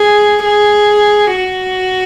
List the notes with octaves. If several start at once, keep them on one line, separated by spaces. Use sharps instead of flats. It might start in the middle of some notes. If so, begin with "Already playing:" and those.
Already playing: G#4
G#4
F#4